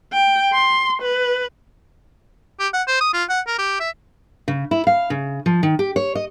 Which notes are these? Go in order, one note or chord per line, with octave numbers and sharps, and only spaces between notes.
G5
C6
B4
G4
F#5
C5
D#6
F4
F#5
A#4
G4
E5
C#3
E4
F5
C#3
F3
D#3
G4
C#5
D#5